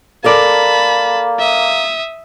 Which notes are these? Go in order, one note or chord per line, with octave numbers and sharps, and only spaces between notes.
A#3 A4 A#4 D5 A5 B5
E5 D#6